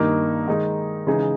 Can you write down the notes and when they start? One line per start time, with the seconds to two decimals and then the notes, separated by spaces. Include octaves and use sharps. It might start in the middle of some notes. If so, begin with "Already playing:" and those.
Already playing: G2 D#3 A#3 D#4
0.48 D#3 G#3 D#4 G#4
1.07 C#3 E3 G#3 D#4 G#4